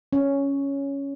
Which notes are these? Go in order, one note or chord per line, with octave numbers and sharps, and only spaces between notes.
C#4